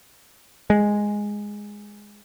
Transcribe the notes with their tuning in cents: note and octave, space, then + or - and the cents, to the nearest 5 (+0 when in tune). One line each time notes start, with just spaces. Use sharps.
G#3 -5